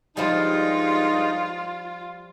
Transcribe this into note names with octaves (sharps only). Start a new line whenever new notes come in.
G2 F3 G3 G#3 D#4 F4